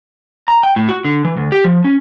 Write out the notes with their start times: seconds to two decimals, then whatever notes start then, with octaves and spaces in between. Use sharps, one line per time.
0.48 A#5
0.63 G5
0.76 A2
0.89 F#4
1.05 D3
1.25 E3
1.37 D2
1.52 G4
1.64 F3
1.84 C#4